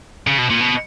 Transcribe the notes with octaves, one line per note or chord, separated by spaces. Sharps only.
C#3
B2
A#2
B2